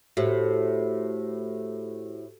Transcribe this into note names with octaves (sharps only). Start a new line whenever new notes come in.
A2 F#4 G4 C5